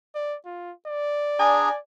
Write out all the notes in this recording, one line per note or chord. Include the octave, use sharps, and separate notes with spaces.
D5
F4
D5
D4 G#4 G#5 A#5